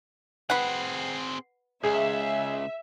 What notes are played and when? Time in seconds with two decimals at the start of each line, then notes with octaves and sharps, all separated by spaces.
0.50 C4 G#4 B4 F#5
1.83 C#2 G#4 E5